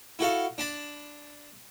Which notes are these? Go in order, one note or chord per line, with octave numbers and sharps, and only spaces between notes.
E4 F#4 A4 F5
D4 A5 B5